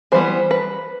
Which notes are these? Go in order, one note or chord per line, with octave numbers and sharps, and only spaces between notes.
E3 G3 B3 C5
B4